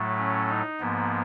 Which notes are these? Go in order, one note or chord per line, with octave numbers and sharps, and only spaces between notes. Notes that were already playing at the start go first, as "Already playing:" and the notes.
Already playing: A2 F#3 A3
C#4
D#4
G#2 F3 A#3 B3